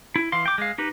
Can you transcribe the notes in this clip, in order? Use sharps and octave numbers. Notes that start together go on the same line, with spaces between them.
E4
E3 F5 C6
G5 D6
G#3 F5
D#4 G4 B4